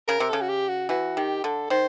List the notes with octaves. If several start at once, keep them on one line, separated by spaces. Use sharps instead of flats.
C#3 A#4
C3
C#3 A4
F#4
G4
F#4
E3 F#4
D#3 G4
D3 A4
D#3 C5